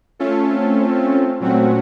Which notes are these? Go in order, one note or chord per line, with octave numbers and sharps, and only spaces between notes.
A3 C#4 F4 A4
C4
C4
A#2 F#3 A3 C4 C#4 F#4